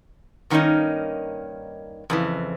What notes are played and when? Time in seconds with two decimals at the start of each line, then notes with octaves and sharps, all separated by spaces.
0.50 G2 D#3 A#3 C4 C#4 D#4
2.10 F2 C#3 E3